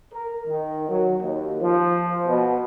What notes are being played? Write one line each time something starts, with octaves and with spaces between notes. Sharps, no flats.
A#4
D#3
F#3
D#2
F3
B2